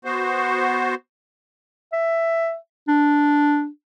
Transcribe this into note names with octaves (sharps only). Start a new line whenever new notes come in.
B3 F#4 C5
E5
D4